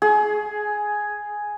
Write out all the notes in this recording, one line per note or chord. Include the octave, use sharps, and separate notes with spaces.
G#4